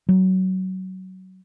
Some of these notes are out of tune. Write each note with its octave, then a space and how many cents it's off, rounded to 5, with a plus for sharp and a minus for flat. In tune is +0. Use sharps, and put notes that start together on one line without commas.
F#3 +20